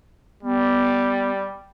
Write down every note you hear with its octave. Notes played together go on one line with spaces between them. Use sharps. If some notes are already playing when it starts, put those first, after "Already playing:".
G3 B3